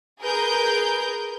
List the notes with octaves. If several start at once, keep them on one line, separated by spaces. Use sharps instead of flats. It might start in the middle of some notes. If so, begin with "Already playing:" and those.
G#4 A#4 B4 G6